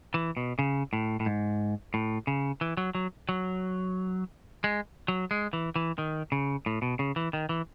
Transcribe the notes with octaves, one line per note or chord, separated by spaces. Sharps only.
E3
B2
C#3
A2
A2
G#2
A2
C#3
E3
F#3
F#3
F#3
G#3
F#3
G#3
E3
E3
D#3
C#3
A2
B2
C#3
E3
D#3
E3